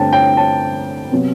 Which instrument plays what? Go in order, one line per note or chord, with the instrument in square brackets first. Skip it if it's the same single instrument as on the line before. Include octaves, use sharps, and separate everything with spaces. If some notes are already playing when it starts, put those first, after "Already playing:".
Already playing: [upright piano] G2 D3 A3 C4 G5 A5
G5
A5
C3 F#3 B3